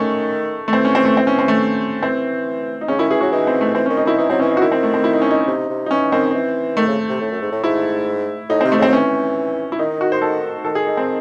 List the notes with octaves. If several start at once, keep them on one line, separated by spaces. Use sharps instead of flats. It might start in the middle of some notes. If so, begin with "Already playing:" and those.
Already playing: D#3 A3 C#4
A3
E3 C4
C#4
C4
A3
C4
C#4
C4
A3
E3 C4
D#4
C#3 C#4
D#3 E4
E3 G#4
F#3 F#4
E3 D#4
C4
A3
E3 C4
D#3 C#4
D#4
D#3 E4
E3 D#4
F#3 C4
E3 C#4
D#4
F#4
D#3 E4
C4
A3
C4
E4
D#4
C#4
D#4
C3
C3
D#4
E3 C#4
D#3 C4
E3
D#3 A3
C#3
C3
A2
F#2
G#2
A2
G#2 E4
A2 D#4
C3 C4
A3
C#3 C4
F#3
E3 C#4
E4
D#3 D#4
F#4
C5
A4
D#3 A4
G#4
D#4
C4